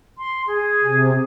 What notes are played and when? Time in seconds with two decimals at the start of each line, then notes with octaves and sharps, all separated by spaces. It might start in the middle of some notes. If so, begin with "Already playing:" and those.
0.18 C6
0.47 G#4
0.82 C3